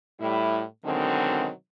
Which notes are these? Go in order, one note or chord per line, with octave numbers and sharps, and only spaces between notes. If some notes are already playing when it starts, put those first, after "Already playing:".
A2 G3 E4
B2 D3 D#3 F#3 G#3 C4